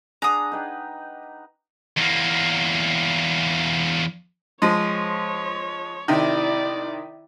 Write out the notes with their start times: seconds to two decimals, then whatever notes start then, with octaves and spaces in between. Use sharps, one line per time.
0.22 D4 G#4 F#5 A#5 D#6
0.52 D#4 B4 G5
1.97 E2 A#3
4.62 F3 G#3 C#5
6.08 C3 D#3 E4 D5